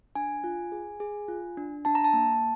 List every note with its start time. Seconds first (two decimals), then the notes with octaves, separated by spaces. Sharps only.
0.15 D4 G#5
0.44 F4
0.72 G#4
1.00 G#4
1.28 F4
1.57 D4
1.85 D4 A5
1.95 A#5
2.04 A5
2.13 A#3